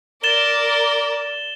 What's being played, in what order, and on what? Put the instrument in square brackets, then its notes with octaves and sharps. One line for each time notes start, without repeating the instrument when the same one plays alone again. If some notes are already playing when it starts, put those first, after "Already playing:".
[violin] A#4 D5 [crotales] A6 E7 G7